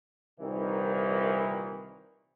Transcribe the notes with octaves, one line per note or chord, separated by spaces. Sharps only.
C2 A#2 D#3 E3